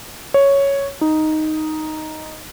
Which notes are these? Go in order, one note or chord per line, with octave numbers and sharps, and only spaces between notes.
C#5
D#4